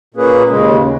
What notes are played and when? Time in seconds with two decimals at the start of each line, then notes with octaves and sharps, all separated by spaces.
0.14 A#2 A#3 C#4 G#4 B4
0.49 D#2 C#3 G#3